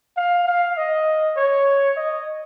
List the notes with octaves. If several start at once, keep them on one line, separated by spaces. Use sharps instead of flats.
F5
F5
D#5
C#5
D#5